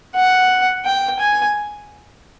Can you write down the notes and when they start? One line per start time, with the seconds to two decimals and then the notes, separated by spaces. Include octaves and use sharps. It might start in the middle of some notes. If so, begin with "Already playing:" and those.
0.15 F#5
0.85 G5
1.19 G#5